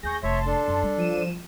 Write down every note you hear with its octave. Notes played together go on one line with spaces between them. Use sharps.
D#2 G#4 C#6 G6 A#6
F1 C#5 E5 A5 C6
D4 A4
F#2
G3
F3 D#7 E7